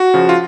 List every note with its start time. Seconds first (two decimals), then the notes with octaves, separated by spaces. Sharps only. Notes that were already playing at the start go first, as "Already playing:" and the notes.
Already playing: F#4
0.14 C#3 F3
0.29 F4